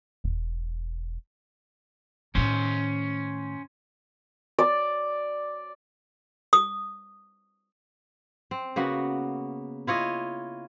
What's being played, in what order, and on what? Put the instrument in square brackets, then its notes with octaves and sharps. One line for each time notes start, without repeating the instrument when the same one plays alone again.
[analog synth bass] E1
[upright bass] A2 D#3 [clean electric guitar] C#4 C5
[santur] D5
[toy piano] D#6
[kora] C4
C#3 A#3 B3 F#4
E4 F4 C#5 D#5